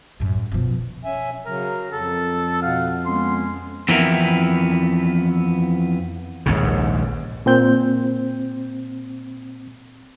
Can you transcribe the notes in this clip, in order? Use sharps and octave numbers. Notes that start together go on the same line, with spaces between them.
F#2 A2
B2 F3
C#4 E5 G#5
C#3 F#3 A#4
F2 A4
B2 F5 F#5
G#3 B3 C#4 C6
F2 E3 B3 C4 E4 A#4
A#1 D#2 G#2 C#3
A#2 C4 G6